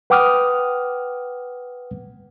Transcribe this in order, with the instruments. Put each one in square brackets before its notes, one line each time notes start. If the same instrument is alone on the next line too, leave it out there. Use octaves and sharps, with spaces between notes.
[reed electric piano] B4 F#5 G5 D6 D#6 F6